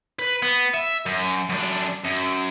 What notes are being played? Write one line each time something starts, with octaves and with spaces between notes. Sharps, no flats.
B4
B3
E5
F#2
F#2 D4
F#2